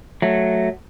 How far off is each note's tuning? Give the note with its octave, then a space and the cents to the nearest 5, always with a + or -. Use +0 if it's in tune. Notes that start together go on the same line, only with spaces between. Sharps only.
F#3 +0 A3 +0